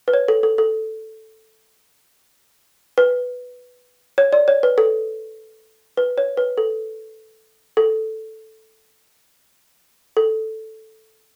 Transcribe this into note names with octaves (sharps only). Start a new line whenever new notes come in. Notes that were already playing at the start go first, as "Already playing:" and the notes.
B4
C#5
A4
A4
A4
B4
C#5
D5
C#5
B4
A4
B4
C#5
B4
A4
A4
A4